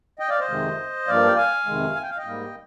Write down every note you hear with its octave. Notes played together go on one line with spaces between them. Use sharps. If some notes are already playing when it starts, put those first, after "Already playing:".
D#5 G5
D5 F5
C5 D#5
F2 C3 D#3 G#3
G2 F3 A#3 D5 F5
G5
F5 G#5
F2 C3 D#3 G#3
G#5
G5
F5
D#5 G5
G#2 G3 A#3